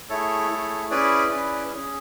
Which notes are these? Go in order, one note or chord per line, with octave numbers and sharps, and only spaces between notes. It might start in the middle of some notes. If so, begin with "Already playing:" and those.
A3 E4 G#4 A4 C#5
A3 E4 G#4
C#4 E4 G#4 B4 D5
C#4 E4 G#4
C#4 G#4